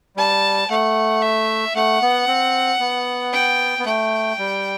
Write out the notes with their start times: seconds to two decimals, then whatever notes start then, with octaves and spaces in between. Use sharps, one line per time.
0.17 G3 A5
0.70 A3 F#5
1.22 E5
1.75 A3 F#5
2.02 B3
2.28 C4
2.80 B3
3.32 G5
3.79 B3
3.85 A3 G5
4.39 G3